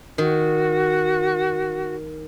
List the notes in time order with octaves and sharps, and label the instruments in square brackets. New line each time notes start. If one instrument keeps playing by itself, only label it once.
[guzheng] D#3 [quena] F#4